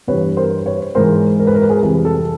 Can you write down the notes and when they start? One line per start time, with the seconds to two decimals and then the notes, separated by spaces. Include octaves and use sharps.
0.07 G2 E3 G3 B4 C#5
0.37 A#4 C5
0.66 B4 C#5
0.95 G#2 E3 G#3 A#4 C5
1.39 A#4
1.47 B4
1.54 A#4
1.62 B4
1.69 G#4 A#4
1.83 F2 C3 E3 G3 G#4
2.04 G4 A4